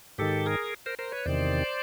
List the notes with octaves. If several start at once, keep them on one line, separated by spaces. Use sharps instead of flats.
G#2 D#3 G4 A4
G#4 A#4
A#4 C5
A#4 C5
B4 C#5
E2 C3 D#3 C5 D5